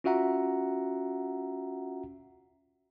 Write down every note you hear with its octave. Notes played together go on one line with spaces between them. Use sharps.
C#4 F4 F#4 E5 F#5 A#5